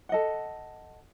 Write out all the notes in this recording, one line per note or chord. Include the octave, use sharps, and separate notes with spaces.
A4 D#5 F#5